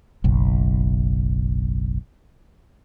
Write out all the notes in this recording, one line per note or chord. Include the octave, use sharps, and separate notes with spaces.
F#1 B1